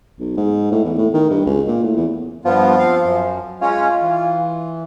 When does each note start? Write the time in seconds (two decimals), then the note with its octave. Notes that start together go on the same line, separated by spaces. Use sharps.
0.20 B1
0.37 G#2
0.71 A2
0.84 E2
0.98 A2
1.14 D#3
1.30 G2
1.46 C#2
1.68 A#2
1.83 A2
1.96 E2
2.45 G2 F3 B3 F4
2.78 C4 F5
3.03 F#2
3.62 G#3 C#4 F4 C#5
4.01 E3